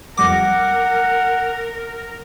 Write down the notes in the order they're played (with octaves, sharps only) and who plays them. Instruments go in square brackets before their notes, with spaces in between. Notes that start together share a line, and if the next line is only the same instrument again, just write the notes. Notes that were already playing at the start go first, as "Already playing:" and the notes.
[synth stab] F2 G3 A#6 [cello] A#4 [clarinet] F#5 [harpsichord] D6